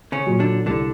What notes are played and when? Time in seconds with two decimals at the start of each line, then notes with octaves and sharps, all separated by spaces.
0.12 C#3 C#4
0.26 A#2 F#3
0.39 D3 D4
0.66 C2 D3 D4